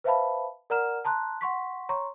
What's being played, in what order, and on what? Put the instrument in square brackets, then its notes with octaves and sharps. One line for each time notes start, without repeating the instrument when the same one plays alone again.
[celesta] B4 C5 E5 F5 A5 B5
A#4 D5 F#5 A#5 F6 E7
A5 A#5 C6 F#6
F#5 C6 C#6 B6
C#5 A#5 C6 C#6